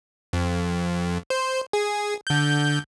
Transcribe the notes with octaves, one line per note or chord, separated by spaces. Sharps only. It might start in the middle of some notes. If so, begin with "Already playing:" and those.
F2
C5
G#4
D3 G6